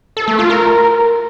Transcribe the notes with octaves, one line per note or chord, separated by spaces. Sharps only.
A4
A3
F4
A#4